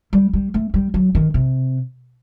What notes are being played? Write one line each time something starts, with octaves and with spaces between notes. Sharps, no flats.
G3
G3
A3
G3
F#3
D#3
C3